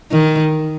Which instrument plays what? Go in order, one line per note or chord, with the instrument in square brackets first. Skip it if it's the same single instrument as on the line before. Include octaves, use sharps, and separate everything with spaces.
[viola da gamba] D#3